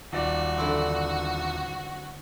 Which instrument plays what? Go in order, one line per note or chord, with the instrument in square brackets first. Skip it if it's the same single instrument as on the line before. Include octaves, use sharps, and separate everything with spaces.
[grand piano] D#1 D5 [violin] F#4
[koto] D3 E3 C4